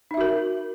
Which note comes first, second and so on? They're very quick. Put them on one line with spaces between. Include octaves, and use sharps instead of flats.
D#4 E5 F#4 A#4